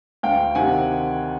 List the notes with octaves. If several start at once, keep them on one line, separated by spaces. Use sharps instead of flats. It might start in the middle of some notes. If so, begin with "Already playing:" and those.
D2 F5 G5
C3 D#3 F#5 G#5